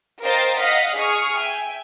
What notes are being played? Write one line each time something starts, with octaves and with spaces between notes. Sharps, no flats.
A#4 C5 D#5 F5 G5 A6
D#5 F5 F#5 D#6 F6 B6
G#4 C#6 D#6 F6
E5 G5 G#5